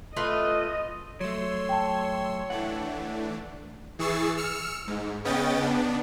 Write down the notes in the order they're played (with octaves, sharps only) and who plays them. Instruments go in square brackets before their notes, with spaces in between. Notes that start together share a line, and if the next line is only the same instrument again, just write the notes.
[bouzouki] A3 F4 B4 [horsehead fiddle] D#5
[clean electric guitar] F#3 A3 [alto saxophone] C#5 [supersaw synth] C6 E6
[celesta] G5 A5
[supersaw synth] E3 A3 D4 [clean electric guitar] F#5
[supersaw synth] E3 G#4 C#6 E6 A6 C7
E6 F6 C#7
G#2
C#3 B3 C#4 D#5 G5 A6
B3 D4